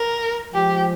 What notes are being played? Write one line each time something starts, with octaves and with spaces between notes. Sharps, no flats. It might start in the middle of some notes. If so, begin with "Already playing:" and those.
Already playing: A#4
F3 G#3 G4